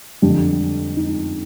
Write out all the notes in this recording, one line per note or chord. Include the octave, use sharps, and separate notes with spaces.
F2 D3 G3
D#4